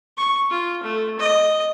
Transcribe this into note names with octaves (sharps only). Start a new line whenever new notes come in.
C#6
F4
A3
D#5